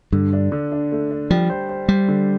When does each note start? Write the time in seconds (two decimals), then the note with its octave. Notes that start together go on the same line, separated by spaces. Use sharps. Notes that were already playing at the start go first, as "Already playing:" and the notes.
0.12 G2 D3
0.33 D4
0.52 D3
0.72 D4
0.92 A3
1.11 D4
1.30 F3 G3
1.50 C5
1.69 C5
1.88 G3 C5
2.08 D3